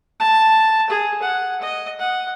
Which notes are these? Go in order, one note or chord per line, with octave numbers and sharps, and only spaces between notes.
A5
G#4
F#5
D#5
F#5